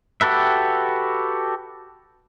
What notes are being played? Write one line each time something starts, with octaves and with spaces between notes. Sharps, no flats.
F#4 G4 A4 B4 E5